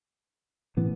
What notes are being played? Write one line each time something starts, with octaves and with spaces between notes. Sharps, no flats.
A2 E3 B3